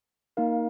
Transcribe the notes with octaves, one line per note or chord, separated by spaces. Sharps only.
A#3 D#4 A#4 F5